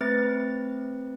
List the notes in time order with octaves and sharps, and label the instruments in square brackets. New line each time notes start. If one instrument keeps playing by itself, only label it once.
[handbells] A3 C4 B4 A6